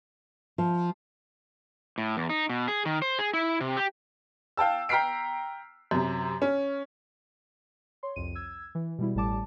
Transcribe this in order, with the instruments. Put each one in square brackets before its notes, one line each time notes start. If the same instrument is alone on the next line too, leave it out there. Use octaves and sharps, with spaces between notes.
[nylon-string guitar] F3
[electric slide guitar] A2
E2
D#4
B2
G#4
D#3
C5
G#4
E4
C3
G4
[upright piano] F5 G5 A5 E6
G5 A#5 F6 B6 C7 D7
F#2 C3
C#4
[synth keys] C#5 C6
C2 F2 D#7
E6 G#6
E3
B2 G3 E4
A1 A2 G3 A5 D6